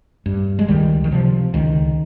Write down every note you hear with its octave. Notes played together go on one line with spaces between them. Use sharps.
G2
G#3
C#2 D#3 G3
D#3
C3 F3
C#2 D#3